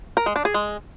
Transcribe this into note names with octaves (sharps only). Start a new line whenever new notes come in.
A#4
G#3
D4
G#4
G#3